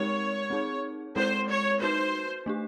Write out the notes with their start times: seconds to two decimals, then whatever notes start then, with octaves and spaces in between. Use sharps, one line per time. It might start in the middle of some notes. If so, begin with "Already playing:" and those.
Already playing: G#3 C4 D#4 G4 A#4 C#5
0.50 C4 D#4 G#4
1.16 G#3 C4 E4 A4 C5
1.49 C#5
1.82 D#4 F#4 B4 C5
2.46 A3 D4 G4